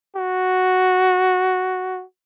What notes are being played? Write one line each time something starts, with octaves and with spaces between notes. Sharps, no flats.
F#4